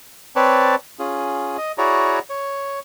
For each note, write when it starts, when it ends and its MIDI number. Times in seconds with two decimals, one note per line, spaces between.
0.36 0.75 60
0.36 0.75 71
0.36 0.75 73
0.36 0.75 74
0.36 0.75 81
0.99 1.57 61
0.99 1.57 65
0.99 1.57 68
1.58 1.72 75
1.78 2.19 64
1.78 2.19 66
1.78 2.19 68
1.78 2.19 73
1.78 2.19 74
1.78 2.19 82
2.30 2.80 73